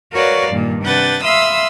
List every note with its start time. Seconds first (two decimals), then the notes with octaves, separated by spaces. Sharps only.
0.12 F#4 A#4 B4 C#5 D5 F5
0.52 G2 A#2 D#3 A#3
0.82 C3 D4 B4 F#5 G6 A6
1.23 E5 F5 B5 C6 D#6 E6